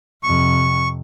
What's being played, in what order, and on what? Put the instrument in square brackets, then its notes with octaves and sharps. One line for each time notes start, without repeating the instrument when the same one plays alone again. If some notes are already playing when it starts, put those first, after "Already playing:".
[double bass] F2 C3 [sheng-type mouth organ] C#6